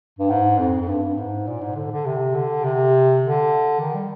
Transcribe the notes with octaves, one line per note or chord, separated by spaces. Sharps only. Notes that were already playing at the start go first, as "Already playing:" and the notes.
G2
G#2
F2
F2
G2
G2
G#2
A#2
G#2
D3
D3
C3
D3
C3
D3
D#3
G3